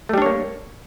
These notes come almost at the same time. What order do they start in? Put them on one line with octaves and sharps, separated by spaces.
A3 G3 D4 C#5 A#3